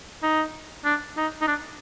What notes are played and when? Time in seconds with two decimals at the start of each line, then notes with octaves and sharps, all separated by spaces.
0.23 D#4
0.85 D4
1.17 D#4
1.41 D#4
1.48 D4